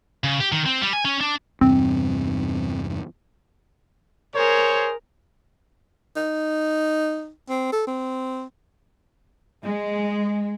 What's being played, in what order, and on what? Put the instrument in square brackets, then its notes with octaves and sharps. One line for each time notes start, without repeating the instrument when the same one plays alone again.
[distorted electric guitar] C#3
G4
D#3
C4
G3
G#5
C#4
D4
[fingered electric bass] E2 G2 C3 [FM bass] C4
[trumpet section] G#4 C5 C#5 [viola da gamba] A#4
[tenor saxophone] D#4
C4
A4
C4
[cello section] G#3